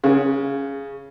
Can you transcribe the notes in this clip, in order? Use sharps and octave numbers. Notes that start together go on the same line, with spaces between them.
C#3